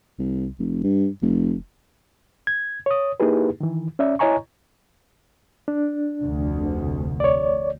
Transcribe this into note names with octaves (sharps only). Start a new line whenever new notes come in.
C2
F1
G2
F1
G#6
C#5 D#6
A#3 D#4 E4 G4 G#4 B4
D#3 E3
C#4 D5 E5
E4 C#5 D#5 G#5 A#5 C#6
D4
F1 D2
C#5 D5